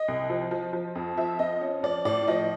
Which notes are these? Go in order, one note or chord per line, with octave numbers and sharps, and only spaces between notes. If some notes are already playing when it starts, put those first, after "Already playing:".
Already playing: D#5
C2
F3
F3
F3
F2
F3 E5
F2 D#5
C#4
F3 D5
A2 D5
F3 D#5